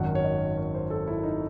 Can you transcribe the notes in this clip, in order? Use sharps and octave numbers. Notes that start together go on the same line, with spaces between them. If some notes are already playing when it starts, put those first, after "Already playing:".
Already playing: G#1 F#2 D#3 F#5
C#5
D#5
C#5
C5
A4
E4
D#4